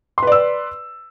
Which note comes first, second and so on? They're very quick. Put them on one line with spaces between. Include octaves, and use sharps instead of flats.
C6 B4 D5 E6